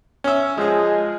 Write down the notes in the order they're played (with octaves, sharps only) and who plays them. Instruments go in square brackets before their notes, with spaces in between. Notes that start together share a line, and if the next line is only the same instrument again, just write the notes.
[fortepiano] C#4 E5
[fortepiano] F3 G#4 [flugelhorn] G#3